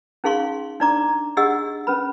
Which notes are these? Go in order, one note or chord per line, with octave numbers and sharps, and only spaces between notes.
C#4 D#4 G#4 F5 C6 C#6
D4 D#4 D5 A#5 D6
D4 G4 G#4 D#5 F#5 E6
C#4 B4 B5